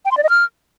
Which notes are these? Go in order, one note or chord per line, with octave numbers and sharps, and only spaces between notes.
G5
C6
D5
D#5
F6